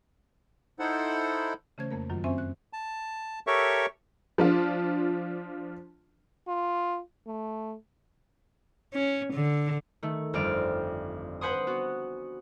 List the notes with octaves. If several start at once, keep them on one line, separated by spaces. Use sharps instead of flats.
D#4 E4 A4 C5 F#5
C#3 E3 A3 C#4 C5 G#6
F2 A3 A#3 A#4
F#2 D#3 F#3 F4
C4 C#4 C5 E5 G#5
F#6
A5
G4 A4 A#4 C#5 E5 C#6
F3 D4 F4
F4
A3
C#4
D3
D#3 A3
G1 F2 C4 D5 F6 D7
B4 C5 F#5 G#5 C6 D#6
B3 F#4